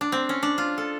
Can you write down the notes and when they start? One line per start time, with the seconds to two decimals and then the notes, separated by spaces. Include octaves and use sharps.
0.01 D4
0.12 C4
0.29 C#4
0.43 D4
0.58 F4
0.78 A4